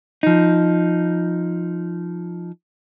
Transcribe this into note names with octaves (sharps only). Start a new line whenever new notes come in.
F3 D#4